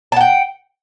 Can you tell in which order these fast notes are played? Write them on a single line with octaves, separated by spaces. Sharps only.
A5 F#5 G5